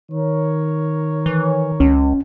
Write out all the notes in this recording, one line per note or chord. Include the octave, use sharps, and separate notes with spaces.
D#3 A#4 C#5
E3
C#2 C#4